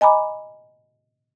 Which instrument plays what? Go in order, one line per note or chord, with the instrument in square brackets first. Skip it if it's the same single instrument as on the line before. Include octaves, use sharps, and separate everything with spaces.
[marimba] D#5 G#5 A#5 B5 D6